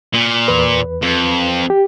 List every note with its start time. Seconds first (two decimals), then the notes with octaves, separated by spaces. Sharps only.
0.13 A#2
0.48 E2 B4
1.02 F2
1.70 G4